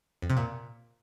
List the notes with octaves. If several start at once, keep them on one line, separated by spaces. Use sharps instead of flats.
F2
C3
A#2